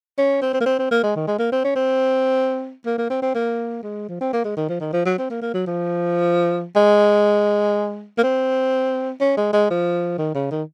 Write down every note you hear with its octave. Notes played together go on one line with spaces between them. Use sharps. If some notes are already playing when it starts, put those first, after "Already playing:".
C#4
C4
C4
A#3
C4
C4
A#3
G#3
D#3
G#3
A#3
C4
C#4
C4
A#3
A#3
C4
C4
A#3
G#3
F3
C4
A#3
G#3
D#3
F3
D#3
F3
F#3
C4
A#3
A#3
F#3
F3
G#3
A#3
C4
C#4
G#3
G#3
F3
D#3
C#3
D#3